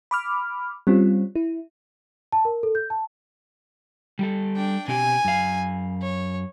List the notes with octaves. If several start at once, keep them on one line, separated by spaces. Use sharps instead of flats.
B5 D6 F6
G3 C4 C#4 F4
E4
A5
A#4
A4
G6
A5
G3 G4 A4
D4 G5
B2 C4 G4 G#5
F#2 F5
C#5